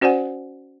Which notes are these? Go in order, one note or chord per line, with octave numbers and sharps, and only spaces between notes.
C#4 F#4 C5 D5 F#5 G#5